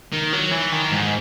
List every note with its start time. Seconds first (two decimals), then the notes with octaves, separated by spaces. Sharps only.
0.13 D#3
0.33 F#3
0.51 E3
0.72 D#3
0.91 G#2